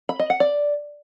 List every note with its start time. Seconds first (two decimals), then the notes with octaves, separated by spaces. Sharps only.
0.09 B5
0.19 D#5
0.30 F#5
0.40 D5